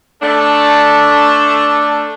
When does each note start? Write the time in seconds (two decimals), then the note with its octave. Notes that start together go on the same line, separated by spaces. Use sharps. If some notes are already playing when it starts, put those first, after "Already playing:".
0.21 A3 D4 A4